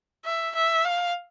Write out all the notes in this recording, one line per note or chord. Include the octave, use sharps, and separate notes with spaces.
E5
E5
F5